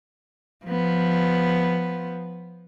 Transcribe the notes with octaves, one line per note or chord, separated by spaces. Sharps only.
F3 B3